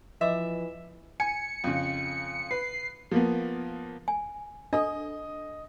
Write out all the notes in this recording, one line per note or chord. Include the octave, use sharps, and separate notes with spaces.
E3 F3 D#5 E5 D6 E6
G#5 C#7
F2 C#3
B4 C7
F3 A#3 B3
G#5
D4 A4 D#5